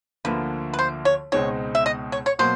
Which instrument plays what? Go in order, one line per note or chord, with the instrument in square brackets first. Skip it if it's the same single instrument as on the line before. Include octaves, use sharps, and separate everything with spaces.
[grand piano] D2 D3 F3 A#3 [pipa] B4
[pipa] B4
C5
C#5
[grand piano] C#2 B2 G#3 C4 D#4 [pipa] C#5
[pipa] E5
D#5
C#5
C#5
[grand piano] B2 F#3 A#3 [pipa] C5